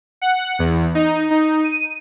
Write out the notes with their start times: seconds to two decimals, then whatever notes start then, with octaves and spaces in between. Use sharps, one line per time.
0.22 F#5
0.59 E2
0.95 D#4
1.30 D#4
1.64 D#7